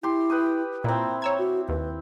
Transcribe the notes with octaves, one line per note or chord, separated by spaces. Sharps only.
E4 G4 C6
B4 G5 D#6
A#2 C4 E4 A#5
C#5 A#5 E6 G#6
F#4
D#2 B4